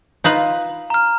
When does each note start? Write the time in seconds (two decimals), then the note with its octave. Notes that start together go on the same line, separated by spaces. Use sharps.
0.24 D#4 F4 B4
0.90 A#5 F6